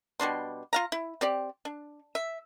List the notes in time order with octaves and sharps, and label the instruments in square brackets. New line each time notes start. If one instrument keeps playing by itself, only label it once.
[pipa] B2 G3 D4 C6
F4 F5 A#5
E4
C4 G4 D5
D4
E5